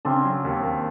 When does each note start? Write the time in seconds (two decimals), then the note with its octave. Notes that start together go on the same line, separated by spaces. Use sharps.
0.05 C#3 C4 D4
0.25 F#3
0.44 D#2
0.63 D#2